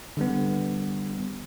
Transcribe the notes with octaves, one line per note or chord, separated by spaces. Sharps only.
D3 G3 B3